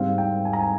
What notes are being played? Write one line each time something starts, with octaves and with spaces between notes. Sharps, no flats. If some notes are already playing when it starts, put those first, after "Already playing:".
Already playing: G#2 G3 C4 F5
G5
G#5
A#5
G#5